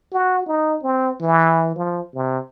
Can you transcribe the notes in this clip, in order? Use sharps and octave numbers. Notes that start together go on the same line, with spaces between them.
F#4
D#4
C4
E3
F3
C3